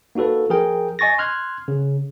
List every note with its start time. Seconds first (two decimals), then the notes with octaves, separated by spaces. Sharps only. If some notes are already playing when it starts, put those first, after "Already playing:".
0.15 A#3 D#4 F#4 A4 B4
0.50 F3 G#4 A#4 G5
0.99 D#5 G#5 C#6 A6 A#6
1.18 C6 F6 F#6 G#6
1.68 C#3